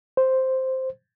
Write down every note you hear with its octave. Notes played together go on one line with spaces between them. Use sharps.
C5